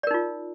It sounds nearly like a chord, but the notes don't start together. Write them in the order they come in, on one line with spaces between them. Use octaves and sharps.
D5 A#4 D#4 F4